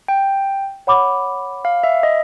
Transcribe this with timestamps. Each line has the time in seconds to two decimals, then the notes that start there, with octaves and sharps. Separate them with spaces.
0.08 G5
0.87 C#5 F#5 B5 D6
1.65 F5
1.84 E5
2.03 D#5